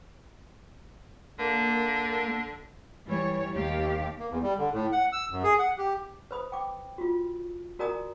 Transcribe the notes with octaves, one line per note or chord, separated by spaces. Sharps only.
D3 A#3
E3 G3 C#5
D#2 G4 F5
A#3
E2
G3
D3
A2
F#5
E6
F#2
G#4
F#5
G4
B4 C5 B5 D#6
G5 D6
F4 F#4
F#4 A#4 D5 G#5 A#5 D#6